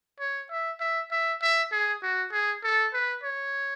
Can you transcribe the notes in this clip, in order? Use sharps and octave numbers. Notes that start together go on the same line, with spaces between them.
C#5
E5
E5
E5
E5
G#4
F#4
G#4
A4
B4
C#5